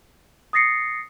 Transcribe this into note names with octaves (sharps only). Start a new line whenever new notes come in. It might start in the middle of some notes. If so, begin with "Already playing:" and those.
D#6 A6 A#6 C7 C#7